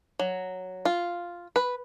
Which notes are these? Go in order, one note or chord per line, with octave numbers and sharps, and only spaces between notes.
F#3
F4
B4